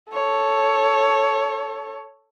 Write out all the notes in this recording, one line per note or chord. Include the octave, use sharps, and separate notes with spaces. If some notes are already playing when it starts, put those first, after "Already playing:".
A4 C#5